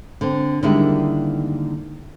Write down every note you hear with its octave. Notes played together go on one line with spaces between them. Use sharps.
D3 C4
D3 D#3 G3 G#3 A#3 E4